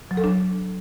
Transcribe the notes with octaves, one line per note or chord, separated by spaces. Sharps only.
F#3
A4
D4